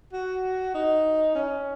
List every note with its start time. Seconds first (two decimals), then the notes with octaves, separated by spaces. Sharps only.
0.13 F#4
0.74 D#4
1.35 C#4